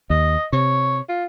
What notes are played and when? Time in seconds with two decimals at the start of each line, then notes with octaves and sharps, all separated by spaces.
0.10 D#2 D#5
0.53 C3 C#5
1.09 F4